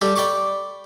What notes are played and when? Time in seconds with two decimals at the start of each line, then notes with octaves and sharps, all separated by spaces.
0.01 G3 G4 A4
0.16 D5 G5 B5 C#6 D6